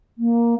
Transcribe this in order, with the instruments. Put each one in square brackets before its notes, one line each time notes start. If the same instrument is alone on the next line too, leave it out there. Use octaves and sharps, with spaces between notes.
[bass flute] A#3